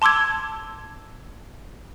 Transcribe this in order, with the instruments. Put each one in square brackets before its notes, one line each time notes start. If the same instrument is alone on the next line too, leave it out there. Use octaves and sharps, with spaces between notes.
[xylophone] A5 C6 D6 E6 G#6